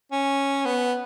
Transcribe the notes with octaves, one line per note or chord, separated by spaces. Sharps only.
C#4
B3